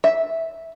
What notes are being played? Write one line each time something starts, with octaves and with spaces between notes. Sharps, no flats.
E5